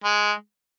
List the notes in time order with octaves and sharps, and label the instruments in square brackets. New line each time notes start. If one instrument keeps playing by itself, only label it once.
[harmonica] G#3